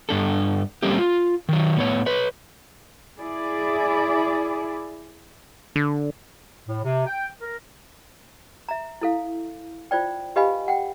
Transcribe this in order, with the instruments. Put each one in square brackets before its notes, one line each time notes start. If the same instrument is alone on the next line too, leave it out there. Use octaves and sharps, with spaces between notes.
[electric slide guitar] G2 D4 A4
G3 A3 A#3 C4 C#4 G4
F4
D#3 F#3
A2 B3 C#5
B4 C#5
[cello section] E4 G#4 D5
[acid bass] D3
[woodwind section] A2
C3
G5
A#4
[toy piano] E5 A#5
E4 A4 F5
F4 C5 D5 G5
G4 B4 D#5 F5 G#5 B5
F#5 G5